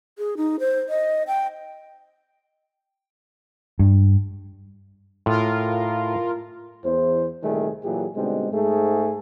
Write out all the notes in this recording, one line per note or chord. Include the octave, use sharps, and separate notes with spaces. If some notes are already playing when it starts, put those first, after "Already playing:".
G#4
D#4
C5
D#5
G5
G2
A2 F4 A#4
E2 C5
C2 A#2 D#3 G3 A3 G#4
A#2 E3 F#3 G4 G#4
B2 D3 G3 G#3 C4 D#4
G#2 A3 G#4